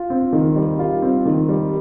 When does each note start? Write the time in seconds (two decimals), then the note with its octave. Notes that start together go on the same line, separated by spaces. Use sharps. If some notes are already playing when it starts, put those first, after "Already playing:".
Already playing: F4
0.10 C4
0.33 D#3
0.56 G3
0.79 F4
1.02 C4
1.25 D#3
1.49 G3